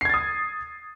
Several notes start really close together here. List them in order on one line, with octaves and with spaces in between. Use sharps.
C7 G#6 A6 D#6